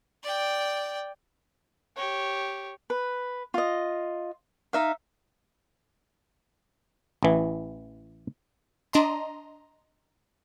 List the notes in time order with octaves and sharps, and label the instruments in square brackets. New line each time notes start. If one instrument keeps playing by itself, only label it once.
[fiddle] D5 G5
[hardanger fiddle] G4 C#5
[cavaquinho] B4
F4 D#5
D#4 E5 F5
[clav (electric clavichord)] A1 E3
[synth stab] D4 D#5 A#5 C6